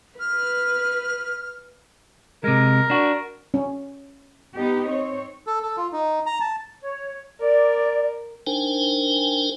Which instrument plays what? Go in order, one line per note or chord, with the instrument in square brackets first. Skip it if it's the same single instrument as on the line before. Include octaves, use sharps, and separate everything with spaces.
[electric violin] B4 [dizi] F6
[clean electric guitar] C3 G#3 [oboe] A#4
[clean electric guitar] D4 F#4
[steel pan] C#4
[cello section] B3 D#4 G4
C4 C#5
[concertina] A4
A4
F4
D#4
A#5
A5
[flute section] C#5
[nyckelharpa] A#4 [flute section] D5
[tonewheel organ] D4 D#4 A#4 C5 G5 G#5